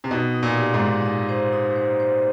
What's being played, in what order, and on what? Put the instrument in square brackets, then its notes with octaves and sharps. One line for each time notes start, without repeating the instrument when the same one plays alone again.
[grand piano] C3
[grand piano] B2 [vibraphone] D#4
[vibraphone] D#4
[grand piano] A#2
[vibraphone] G4
[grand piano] G#2
[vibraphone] D#4
D#4
C5
D#4
C5
C5